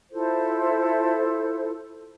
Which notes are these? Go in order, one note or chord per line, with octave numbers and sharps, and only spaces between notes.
E4 F4 A4 C5